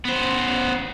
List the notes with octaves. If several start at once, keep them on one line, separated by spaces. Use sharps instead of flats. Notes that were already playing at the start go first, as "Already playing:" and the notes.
B3 C5